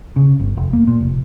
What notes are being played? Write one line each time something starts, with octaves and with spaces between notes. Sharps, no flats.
C#3
G1
F1
A#3
A#2
F1